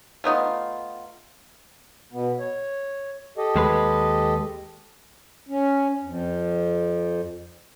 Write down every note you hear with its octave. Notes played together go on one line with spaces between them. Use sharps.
A3 B3 D#4 F4
B2 B3
C#5
G4 A4 D#5
D#2 G#3 B4
C#4
F2